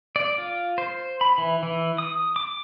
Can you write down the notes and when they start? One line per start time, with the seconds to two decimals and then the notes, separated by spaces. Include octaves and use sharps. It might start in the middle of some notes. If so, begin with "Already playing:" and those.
0.16 D5
0.38 F4
0.78 C5
1.21 B5
1.38 E3
1.63 E3
1.98 D#6
2.36 D6